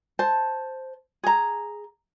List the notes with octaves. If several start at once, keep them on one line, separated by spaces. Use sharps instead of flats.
C5 A5
G#4 A#5